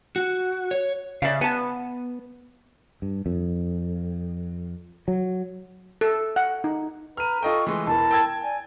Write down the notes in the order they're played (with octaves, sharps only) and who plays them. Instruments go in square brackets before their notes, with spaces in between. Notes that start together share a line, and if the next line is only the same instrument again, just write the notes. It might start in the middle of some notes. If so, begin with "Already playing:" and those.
[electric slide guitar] F#4
C#5
[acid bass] C#3 [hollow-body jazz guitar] D5 E5 F5
[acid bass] B3 [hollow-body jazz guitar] G#5 A5
[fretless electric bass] G2
F2
F#3
[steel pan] A4
F#5
D#4
[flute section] B4 A#5 B5 [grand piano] F6 D#7
[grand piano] F4 D#5 G5 [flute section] A4 C#6
[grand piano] E3 G#3 A3 [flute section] C6
[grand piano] E1 [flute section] E4 A#4 A5
[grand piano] G5 E6 G#6
[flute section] D5 G#5